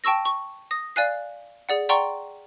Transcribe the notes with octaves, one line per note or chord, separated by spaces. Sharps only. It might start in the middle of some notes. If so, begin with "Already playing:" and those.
G5 A5 C#6 E6 A#6
C#6
D#6 A#6
D5 F5 G#5 F#6 C7
G#4 D5 F#5
D5 F#5 G5 A#5 C6 C#6